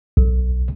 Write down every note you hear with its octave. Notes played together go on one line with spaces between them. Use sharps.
B1